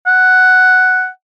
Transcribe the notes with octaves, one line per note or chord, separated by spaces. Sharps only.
F#5